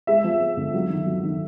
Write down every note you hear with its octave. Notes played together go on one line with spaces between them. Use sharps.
G#3 E5
F3
F3
D3
F#3
D#3
F#3
D#3